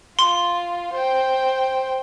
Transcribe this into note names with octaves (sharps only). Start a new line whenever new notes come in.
F4 C6
C5 G5